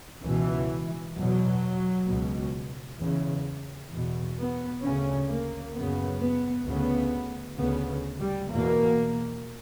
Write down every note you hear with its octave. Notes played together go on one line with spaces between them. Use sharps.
C#2 B2 E3
E2 B2 F#3
C#2 B2
E2 C#3
E2 B2
B3
D2 C#3 C#4
A#3
F#2 C#3 B3
B3
D2 C#3 B3
D2 C#3 B3
G3
E2 B2 A#3